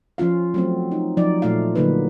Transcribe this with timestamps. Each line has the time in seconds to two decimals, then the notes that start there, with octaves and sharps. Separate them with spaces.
0.18 F3 C#4 F4 F5
0.54 F#3 A3 C4
0.92 D#4
1.17 F3 F#3 D#4 D5
1.42 A#2 A3 F4 F5
1.76 D3 F#3 A#3 D#4 B4